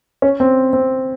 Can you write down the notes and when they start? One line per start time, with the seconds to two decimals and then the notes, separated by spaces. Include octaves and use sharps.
0.22 C#4
0.40 C4
0.73 C4